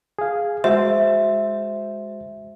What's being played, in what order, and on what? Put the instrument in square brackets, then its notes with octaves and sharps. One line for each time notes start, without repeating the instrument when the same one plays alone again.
[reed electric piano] G#4 F5
[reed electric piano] G#3 F#4 C5 [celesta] E5